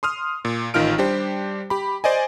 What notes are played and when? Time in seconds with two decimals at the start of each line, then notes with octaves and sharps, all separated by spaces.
0.03 C6 D#6 F6
0.45 A#2
0.74 A1 D#3 D#4 F4 F6 D7
0.98 G3 D4 G4 C5
1.70 G4 B5
2.04 C5 D5 D#5 G#5